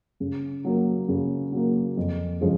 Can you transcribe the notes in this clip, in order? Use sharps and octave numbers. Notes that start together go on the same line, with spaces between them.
C#3
F#3 A#3
C#3
F#3 A#3
F2
C#3 F3 G#3